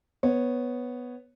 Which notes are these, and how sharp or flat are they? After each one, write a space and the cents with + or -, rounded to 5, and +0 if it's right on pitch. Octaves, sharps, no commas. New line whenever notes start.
B3 +0 C#5 -10